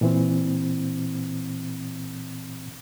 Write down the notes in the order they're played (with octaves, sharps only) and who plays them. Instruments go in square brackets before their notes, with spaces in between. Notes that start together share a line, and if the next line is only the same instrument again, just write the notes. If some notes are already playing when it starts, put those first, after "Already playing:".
[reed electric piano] A#2 E3 C4